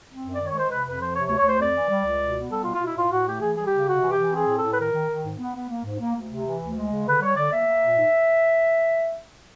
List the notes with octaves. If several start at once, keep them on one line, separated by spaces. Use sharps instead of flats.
C4
F#2
D#3 D5
C#5
G#3 C5
C3 B4
F2 B4
F3 C5
C3 C#5
C#5
D2
C#5
D2 C5
F2 D5
E3
G3
C#2
B2
B3
G3 A4
F4
B2
F4
B2 E4
A2 F4
A2 F#4
A3 G4
E3 G#4
G3 G#4
G4
C#3
C3 F#4
E3
G4
E3
C4 G#4
A2
A4
A2
B4
D#3 A#4
D#3
D#3
G#2
B3
B3
A#3
G#2
A#3
D2
C3
E3
D2
G#3
C#3
D3 B4
G3 C#5
D3 D5
A#3 E5
A#3
A#2
G#2